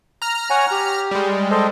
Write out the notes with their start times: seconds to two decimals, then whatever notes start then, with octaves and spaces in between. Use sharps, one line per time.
0.22 A#5 F6
0.50 C#5 F#5 G#5
0.71 G4
1.11 G3 G#3
1.51 A4 C5 D#5